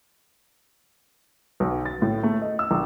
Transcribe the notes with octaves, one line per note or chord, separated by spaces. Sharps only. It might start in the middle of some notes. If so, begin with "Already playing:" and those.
B1
A6
A2
A3
D#5
E6
A#1